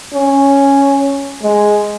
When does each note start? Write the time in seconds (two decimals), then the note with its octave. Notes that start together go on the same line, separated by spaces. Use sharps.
0.14 C#4
1.43 G#3